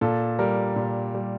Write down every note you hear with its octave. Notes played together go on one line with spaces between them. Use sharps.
A#2 A4
G3 A#4
A#2
G3